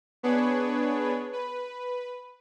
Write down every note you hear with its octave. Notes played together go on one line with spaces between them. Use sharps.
B3 D4 G#4 B4 C#5
B4